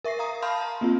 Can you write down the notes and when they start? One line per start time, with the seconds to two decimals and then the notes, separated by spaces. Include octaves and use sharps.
0.05 A#4 E5 C#6 A#6 C7
0.19 F5 A#5 D#6
0.42 F5 A5 B5 C6 F6 G6
0.61 A#5
0.81 A#3 C4 F4